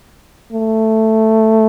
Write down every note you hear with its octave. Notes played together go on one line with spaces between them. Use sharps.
A3